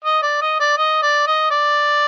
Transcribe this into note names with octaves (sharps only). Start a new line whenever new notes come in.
D#5
D5
D#5
D5
D#5
D5
D#5
D5